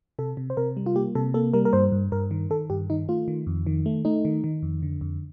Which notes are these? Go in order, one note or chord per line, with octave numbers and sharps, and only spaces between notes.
C3 A4
C3
C5
C3 A#4
G3
F4
A#3 G4
C3 A4
A#3 A4
G3 A#4
A#4
G2 C5
G2
G2 A#4
D#3
D#3 A4
G2 G4
D#3 D#4
A3 F4
D#3
F2
D#3
A3
A3 D#4
D#3
D#3
F2
D3
F2